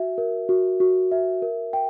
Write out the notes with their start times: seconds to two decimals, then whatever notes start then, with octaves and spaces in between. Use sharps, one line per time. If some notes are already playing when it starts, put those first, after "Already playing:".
Already playing: F#4 E5
0.18 A#4
0.49 F#4
0.80 F#4
1.11 E5
1.42 A#4
1.73 G5